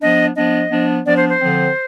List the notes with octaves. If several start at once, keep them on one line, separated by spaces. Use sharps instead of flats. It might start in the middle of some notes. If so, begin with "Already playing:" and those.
F3 B3 D4 D#5
F3 B3 D4 D#5
F3 B3 D4
F3 B3 D4 D5
C5
C5
D3 F3 C4